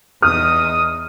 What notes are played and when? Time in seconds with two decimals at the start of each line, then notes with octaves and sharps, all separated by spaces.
0.22 E2 D#4 D#6 F6